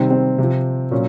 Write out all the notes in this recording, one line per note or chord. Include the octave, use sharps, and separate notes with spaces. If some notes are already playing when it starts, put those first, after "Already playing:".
Already playing: C3 D#3 G3 C4
C4
C3 F3
A#2 F#3 C#4